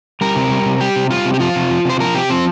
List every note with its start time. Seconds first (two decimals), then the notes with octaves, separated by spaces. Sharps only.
0.21 G3 A#4
0.36 C3
0.51 G3
0.66 C3
0.81 G3 G4
0.96 C3
1.10 G3 F4
1.25 C3
1.34 G4
1.40 F3 F4
1.55 C3
1.70 F3
1.85 C3 C5
2.00 F3 A#4
2.14 C3 G4
2.30 F3 C4